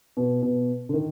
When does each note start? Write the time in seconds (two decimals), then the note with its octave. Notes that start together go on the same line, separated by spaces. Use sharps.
0.17 B2
0.42 B2
0.89 D3
0.94 D#3